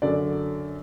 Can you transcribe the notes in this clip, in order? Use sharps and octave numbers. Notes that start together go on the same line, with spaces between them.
F#2 D3 D5